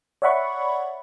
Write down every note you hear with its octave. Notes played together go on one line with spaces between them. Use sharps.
C#5 D5 E5 F#5 B5 C#6